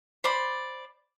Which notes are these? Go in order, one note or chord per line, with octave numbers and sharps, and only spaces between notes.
C5 D5 B5